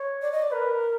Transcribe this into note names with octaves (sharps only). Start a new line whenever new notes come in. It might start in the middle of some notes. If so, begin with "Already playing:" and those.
Already playing: C#5
D5
D#5
D5
A#4 B4